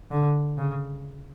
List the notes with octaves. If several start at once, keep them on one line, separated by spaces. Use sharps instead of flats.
D3
C#3